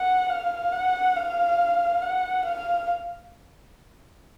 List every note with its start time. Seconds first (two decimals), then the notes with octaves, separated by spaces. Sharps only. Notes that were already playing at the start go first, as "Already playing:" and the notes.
Already playing: F#5
0.29 F5
0.72 F#5
1.15 F5
2.02 F#5
2.45 F5